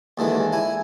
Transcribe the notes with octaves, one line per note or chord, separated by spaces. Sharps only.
D#2 D3 E3 G#3
E4 G#5